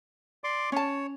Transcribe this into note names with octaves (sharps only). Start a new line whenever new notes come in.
D5 C6 D6
C#4 C#5 A5